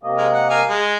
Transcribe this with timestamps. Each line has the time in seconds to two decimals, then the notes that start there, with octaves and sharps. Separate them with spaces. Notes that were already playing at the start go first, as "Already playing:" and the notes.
0.03 C3 A#3 D#5
0.18 G#3 A#4
0.33 F#5
0.50 A#4 F5 G#5
0.69 G#3